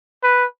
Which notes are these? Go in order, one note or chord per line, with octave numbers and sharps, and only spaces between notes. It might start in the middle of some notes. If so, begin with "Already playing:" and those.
B4